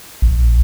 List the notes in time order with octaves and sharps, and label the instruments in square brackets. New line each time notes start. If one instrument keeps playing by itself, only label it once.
[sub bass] A#1